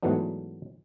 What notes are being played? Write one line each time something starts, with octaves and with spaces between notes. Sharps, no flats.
G#2 E3 F#3 A3 B3 D4